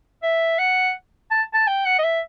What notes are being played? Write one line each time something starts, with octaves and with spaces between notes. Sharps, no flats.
E5
F#5
A5
A5
G5
F#5
D#5
E5